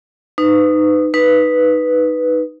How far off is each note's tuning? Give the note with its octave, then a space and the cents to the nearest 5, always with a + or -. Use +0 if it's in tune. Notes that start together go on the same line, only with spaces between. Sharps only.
D#4 -15 B4 +30
D#4 +0 B4 +0